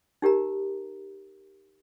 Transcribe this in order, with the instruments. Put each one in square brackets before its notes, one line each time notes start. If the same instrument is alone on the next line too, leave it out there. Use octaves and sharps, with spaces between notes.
[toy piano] D#4 G4 A#4 A#5